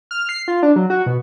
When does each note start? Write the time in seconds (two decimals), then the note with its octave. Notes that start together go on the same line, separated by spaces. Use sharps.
0.11 F6
0.29 C7
0.48 F4
0.63 D4
0.76 F#3
0.90 F#4
1.06 B2